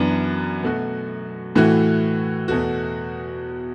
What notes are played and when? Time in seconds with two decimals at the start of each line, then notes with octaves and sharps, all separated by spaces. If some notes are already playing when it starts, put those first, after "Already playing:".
Already playing: F#2 E3 B3 D4
0.63 B2 A3 F#4
1.56 A2 E3 A3 F#4
2.48 E2 B2 A3 F#4